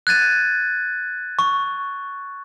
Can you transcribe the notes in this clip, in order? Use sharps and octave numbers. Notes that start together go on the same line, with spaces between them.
F#6 G#6 A6 D#7
C#6